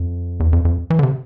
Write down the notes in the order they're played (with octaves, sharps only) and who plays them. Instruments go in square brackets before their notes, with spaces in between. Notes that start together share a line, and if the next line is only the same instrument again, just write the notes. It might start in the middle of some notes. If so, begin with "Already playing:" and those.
Already playing: [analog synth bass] F2
E2
F2
F2
E3
D3
C3